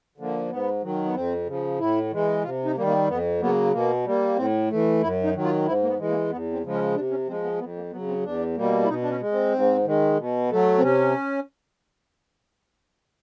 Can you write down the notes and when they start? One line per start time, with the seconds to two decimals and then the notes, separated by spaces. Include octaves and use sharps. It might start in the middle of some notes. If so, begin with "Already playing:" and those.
0.18 D3 F3 A#3
0.50 G#2 B3
0.83 D#3 F#3
1.05 B3
1.14 F2 C4
1.46 C#3 F3
1.79 A2 E4
2.11 E3 G#3
2.43 C3 F4
2.65 D#4
2.76 D#3 G3 A#3
2.87 A#3
3.08 F2 B3
3.41 C#3 F#3 A#3 B3
3.72 B2 A#3
4.05 G3 A#3
4.36 A2 C4
4.70 E3 A3
5.02 F#2 E4
5.23 D#4
5.34 D#3 F#3
5.44 F4
5.66 G#2 E4
5.82 A#3
5.88 B3
5.99 E3 G#3
6.09 A#3
6.30 E2 B3
6.52 C4
6.63 C#3 F3 G#3
6.73 C#4
6.95 C3 D4
7.11 C#4
7.27 F3 G#3 C4
7.43 B3
7.59 F2 B3
7.76 A#3
7.92 C#3 F#3 B3
8.08 C4
8.23 E2 D4
8.56 B2 G3 A#3
8.83 E4
8.88 B2 D#4
9.02 D4
9.10 C#4
9.21 G#3
9.32 C4
9.53 G#2
9.85 D#3 G#3
10.18 B2
10.49 F#3 A3
10.78 C4
10.81 C3 C#4